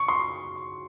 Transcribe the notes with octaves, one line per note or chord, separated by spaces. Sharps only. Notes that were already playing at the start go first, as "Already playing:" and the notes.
Already playing: C#6
C6